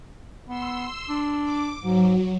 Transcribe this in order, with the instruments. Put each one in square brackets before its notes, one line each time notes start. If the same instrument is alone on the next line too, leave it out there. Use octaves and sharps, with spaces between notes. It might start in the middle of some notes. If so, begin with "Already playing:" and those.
[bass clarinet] B3 [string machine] C6 E6
[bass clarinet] D4
[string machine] D6
[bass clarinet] G#2 [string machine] F#3